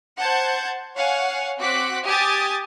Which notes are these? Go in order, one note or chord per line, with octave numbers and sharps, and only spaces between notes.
C5 F#5 A5 G6 G#6
C#5 F5 F#5 G#5
C4 F#4 F#5 D6 F#6 B6
G4 G#5 D#6 G#6 A6